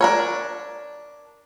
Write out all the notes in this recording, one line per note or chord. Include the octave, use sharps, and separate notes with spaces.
D4 A#4 C#5